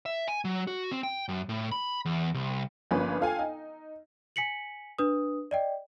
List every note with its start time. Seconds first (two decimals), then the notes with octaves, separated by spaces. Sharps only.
0.06 E5
0.28 G#5
0.45 F#3
0.67 F#4
0.91 C4
1.03 G5
1.29 F#2
1.49 A2
1.71 B5
2.05 E2
2.34 C2
2.91 G1 F3 A#3 C#4 B4
3.21 F4 A4 F5 G5 G#5
3.39 D#4
4.36 G#5 B6 C#7 F#7
4.98 D4 B4 D#6
5.51 D5 D#5 G5